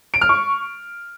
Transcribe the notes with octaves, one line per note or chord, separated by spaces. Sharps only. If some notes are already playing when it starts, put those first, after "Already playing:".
D7
F6
C#6